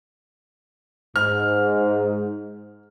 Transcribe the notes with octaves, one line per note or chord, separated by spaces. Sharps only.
G#2 F6